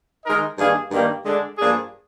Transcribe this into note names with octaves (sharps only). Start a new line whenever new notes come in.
D#3 G#3 D#4 A#4 D#5
G2 D#3 A#3 D4 G#4
G2 D#3 G3 A#3
D3 G#3 D4
G2 F3 A#3 D4 G#4